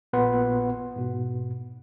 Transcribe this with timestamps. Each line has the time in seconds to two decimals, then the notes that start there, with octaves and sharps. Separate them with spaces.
0.13 A#1 A#2 B3 B4 F#5 C6
0.96 G#2 B2